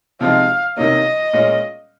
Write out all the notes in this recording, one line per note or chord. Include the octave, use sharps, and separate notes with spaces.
C3 F3 G#3 C4 D#4 F5
C3 D#3 A#3 C#4 D#5
A#2 G#3 C#4